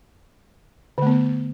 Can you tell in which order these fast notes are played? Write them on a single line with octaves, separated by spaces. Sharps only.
D3 A3 B3